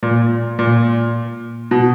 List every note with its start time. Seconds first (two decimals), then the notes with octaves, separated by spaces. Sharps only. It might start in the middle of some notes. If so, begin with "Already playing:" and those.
0.03 A#2
0.59 A#2
1.71 B2